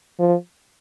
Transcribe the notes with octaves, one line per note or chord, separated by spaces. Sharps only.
F3